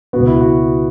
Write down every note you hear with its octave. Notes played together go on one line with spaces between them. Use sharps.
C#2 B2 B3 F#4
E4
F#4